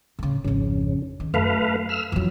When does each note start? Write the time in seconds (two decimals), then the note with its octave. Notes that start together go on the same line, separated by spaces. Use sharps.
0.19 A2 C#3
0.45 G#1 F2 C#3
1.20 D#3
1.34 F#2 A3 B4 F5
1.89 E6 F6
2.12 F2 E3 F#3